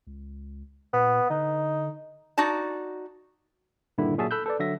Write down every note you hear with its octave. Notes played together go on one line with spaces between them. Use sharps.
C#2
A#2 B3
D3 D#4
D#4 F#4 D5 A5
G2 A#2 D3 D#3 E4
A#2 F#3 F#4 G#4 E5 A5
A4 B5 E6 F#6 G6
A4 B4 D5
D3 F#3 E5 A#6